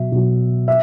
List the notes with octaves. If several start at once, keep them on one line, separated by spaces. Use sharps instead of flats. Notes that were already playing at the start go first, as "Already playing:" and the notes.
Already playing: B2 F#3 E5
B2 F#3
E5